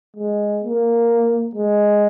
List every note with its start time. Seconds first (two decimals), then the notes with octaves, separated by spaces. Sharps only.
0.16 G#3
0.63 A#3
1.55 G#3